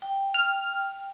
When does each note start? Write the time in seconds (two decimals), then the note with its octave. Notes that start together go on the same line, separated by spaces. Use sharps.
0.02 G5
0.34 F6